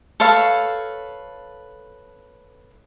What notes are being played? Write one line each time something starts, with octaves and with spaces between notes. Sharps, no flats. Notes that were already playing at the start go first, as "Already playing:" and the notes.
A4 B4 C#5 F5